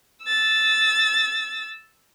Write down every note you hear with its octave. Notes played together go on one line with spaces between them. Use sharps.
E6 A6